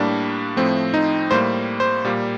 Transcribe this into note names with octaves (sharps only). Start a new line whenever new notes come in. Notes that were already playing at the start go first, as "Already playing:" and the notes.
Already playing: A2 G3 A#3 D4
A2 F3 A3 C4
D#4
A2 G3 A#3 C5
C5
A#2 G3 A#3